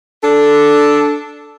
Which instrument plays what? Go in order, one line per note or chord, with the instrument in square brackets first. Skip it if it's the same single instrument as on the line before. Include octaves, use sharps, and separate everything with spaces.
[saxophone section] D4 A4